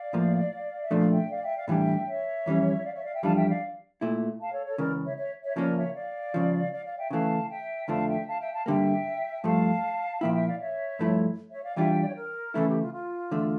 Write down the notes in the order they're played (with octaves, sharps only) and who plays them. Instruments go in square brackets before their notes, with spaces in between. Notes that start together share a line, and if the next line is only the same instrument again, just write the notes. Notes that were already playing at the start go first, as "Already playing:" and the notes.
Already playing: [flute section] D5 F5
[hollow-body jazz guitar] A2 F3 A#3
[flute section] E5
[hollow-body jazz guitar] A#2 F3 A3 D4 [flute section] D5 F5
[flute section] E5 G5
D5 F5
E5 G5
D5 F5
[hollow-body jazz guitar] A2 E3 G3 D4 [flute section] E5 G5
[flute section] C#5 E5
[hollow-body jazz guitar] F2 E3 G3 C#4
[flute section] D5 F5
C#5 E5
D5 F5
E5 G5
[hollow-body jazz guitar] F2 E3 G3 D4 F4 [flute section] F5 A5
[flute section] E5 G5
D5 F5
[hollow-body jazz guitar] A#2 A3 E4
[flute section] F5 A5
A4 C#5
A4 C#5
[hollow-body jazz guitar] C#2 C#3 E3 [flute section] A#4 D5
[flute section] C#5 E5
C#5 E5
C#5 E5
[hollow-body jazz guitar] C#3 F3 A#3 C#4 [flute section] A#4 D5
[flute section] C#5 E5
D5 F5
[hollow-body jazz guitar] C#2 C#3 F3
[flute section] D5 F5
D5 F5
E5 G5
[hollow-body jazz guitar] C#3 E3 A3 [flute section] F5 A5
[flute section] E5 G5
[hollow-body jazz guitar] F2 D3 F3 A3 D4 [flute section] F5 A5
[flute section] E5 G5
F5 A5
E5 G5
F5 A5
[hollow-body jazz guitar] G2 D3 G3 A#3 [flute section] E5 G5
[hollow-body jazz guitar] G2 F3 A3 [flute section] F5 A5
[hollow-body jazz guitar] A#2 F3 A#3 E4 [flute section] E5 G5
[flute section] E5 G5
D5 F5
C#5 E5
[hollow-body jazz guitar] G2 F3 A3 E4
[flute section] C#5 E5
D5 F5
[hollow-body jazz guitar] E2 E3 G3 D4 F4 [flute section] E5 G5
[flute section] E5
D5
C#5
A#4
[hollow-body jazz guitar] C#3 E3 A3 E4 [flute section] A4
[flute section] G4
F4
F4
[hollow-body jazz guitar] E2 D3 A3